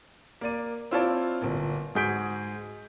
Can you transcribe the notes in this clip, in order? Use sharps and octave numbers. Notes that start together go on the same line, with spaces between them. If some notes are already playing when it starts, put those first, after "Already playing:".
A#3 D5 D#7
C4 E4 F4 C#5 D5 A5
G1 A#2
G#2 F#4 G#4 G6 B6 D7